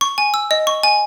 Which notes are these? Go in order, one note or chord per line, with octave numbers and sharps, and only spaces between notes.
C#6
G#5
E6
D#5
C#6
G#5